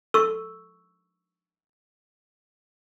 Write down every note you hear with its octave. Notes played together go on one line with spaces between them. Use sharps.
A4 C#6 E6